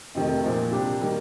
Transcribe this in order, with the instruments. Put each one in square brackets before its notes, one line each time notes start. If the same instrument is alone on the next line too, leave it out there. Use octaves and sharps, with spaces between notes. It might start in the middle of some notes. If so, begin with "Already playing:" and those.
[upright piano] F2 C3 D#3 A3
A#2 F3 A#3
C3 G3 D4 G4
D#3 G3 A#3